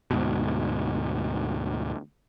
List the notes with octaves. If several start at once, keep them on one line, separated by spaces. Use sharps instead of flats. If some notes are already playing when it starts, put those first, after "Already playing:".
D2 G#2 B2